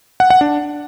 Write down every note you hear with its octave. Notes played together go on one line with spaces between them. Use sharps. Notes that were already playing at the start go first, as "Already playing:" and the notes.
F#5
F#5
D4